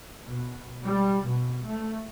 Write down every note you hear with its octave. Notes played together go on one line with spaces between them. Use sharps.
B2
G3
B2
A3